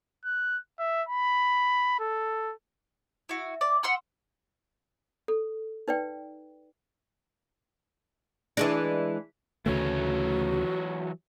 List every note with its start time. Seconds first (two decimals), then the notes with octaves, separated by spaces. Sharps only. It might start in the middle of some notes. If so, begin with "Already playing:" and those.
0.25 F#6
0.79 E5
1.09 B5
2.00 A4
3.29 E4 F#4
3.61 D5
3.83 F#5 C6 E6 F6
5.28 A4
5.88 D#4 B4 D5 G5
8.57 E3 G#3 D4
9.66 D2 C#3 E3 F#3 A3 F#4 C#5